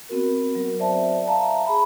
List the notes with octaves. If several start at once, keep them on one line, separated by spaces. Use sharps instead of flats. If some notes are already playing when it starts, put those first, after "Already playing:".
B3 C4 F#4 A#4
F#3 A#4
C5 D5 E5 A5
E5 F5 A5 A#5
G#4 B5